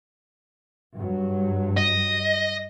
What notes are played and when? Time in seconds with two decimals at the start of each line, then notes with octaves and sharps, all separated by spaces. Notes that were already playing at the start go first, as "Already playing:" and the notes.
0.96 G2 F#3
1.77 D#5